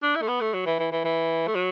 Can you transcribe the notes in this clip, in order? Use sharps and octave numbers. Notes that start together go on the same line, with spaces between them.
D4
E4
A3
B3
A3
F#3
E3
E3
E3
E3
A3
F#3